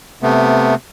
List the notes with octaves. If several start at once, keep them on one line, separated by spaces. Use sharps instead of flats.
C3 A3 B3